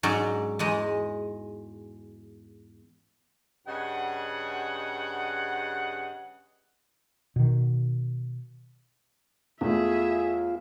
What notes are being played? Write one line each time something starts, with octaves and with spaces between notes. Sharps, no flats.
G#2 F#3 C#4 C#5 D5 A#5
E2 G#3 D#5
G2 C#3 D#5 F#5
B2 D#3
E2 A3 F4 G#4 E5